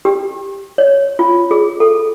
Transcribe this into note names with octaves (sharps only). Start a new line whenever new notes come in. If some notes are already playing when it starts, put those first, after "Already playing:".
G4
C#5
F4
G#4
A4